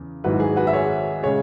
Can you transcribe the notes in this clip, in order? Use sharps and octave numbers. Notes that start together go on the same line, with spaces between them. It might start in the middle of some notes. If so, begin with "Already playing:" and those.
Already playing: E2 C#3
G#1 G#2 F#3 E4 F#4 B4
G#4
F#4 B4
E5
G#4 C#5
C#3 G#3 G#4 C#5